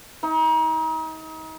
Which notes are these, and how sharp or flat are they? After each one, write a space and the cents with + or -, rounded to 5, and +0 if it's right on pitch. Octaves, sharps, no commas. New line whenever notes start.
D#4 +35